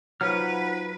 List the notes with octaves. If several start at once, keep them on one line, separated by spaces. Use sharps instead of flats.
F#3 D#4 F4 B4 C5 F5 F#5 F6